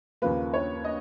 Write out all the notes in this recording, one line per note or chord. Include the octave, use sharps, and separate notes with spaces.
D#2 C#3 F3 A#3 B4
C#5
D#5